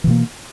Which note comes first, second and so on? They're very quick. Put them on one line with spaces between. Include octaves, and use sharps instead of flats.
E3 B2 A#3